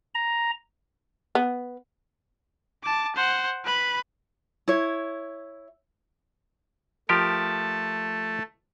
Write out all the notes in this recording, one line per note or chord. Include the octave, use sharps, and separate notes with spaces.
A#5
B3
A5 D6
C5 F#5
B4 B5
E4 C#5
F3 A3 G4 A#4 A5